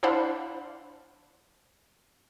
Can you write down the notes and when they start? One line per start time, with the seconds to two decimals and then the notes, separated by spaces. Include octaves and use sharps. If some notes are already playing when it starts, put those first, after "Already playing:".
0.03 D4 E4 C5 F5 F#5 B5